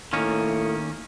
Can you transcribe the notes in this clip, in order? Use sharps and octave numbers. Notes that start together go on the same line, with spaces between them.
A2 D#3 A#3 C#4